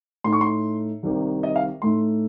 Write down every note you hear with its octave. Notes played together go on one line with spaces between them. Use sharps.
A2 A3 D#4 C6
C#6
C6
C2 C3 D#3
D#5
F5
A2 A3 D#4 C6